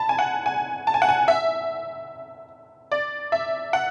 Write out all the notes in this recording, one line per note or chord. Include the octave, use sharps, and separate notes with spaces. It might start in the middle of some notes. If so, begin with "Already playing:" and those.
Already playing: A5 B5
G#5
F#5
G#5
A5
G#5
F#5
G#5
E5
D5
E5
F#5